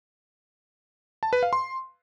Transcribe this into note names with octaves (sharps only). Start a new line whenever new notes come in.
A5
B4
F5
C6